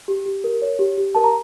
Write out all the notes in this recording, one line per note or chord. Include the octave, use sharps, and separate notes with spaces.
G4
G4
A#4
C#5
G4
G4
A#4 A5
A#5